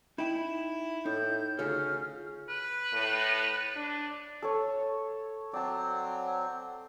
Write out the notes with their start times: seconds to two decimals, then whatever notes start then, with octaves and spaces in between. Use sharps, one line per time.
0.18 D#4 E4 G5
1.06 A2 D#4 G6
1.59 D2 C#3 C#4 F4 A4 F6
2.49 B4
2.93 A2
3.76 D4
4.42 A4 C#5
5.54 F#3 C4 D5 A5